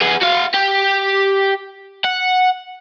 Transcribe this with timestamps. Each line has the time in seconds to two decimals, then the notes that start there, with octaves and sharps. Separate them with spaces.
0.02 B3 G#4
0.22 F#4 F5
0.54 G4
2.05 F#5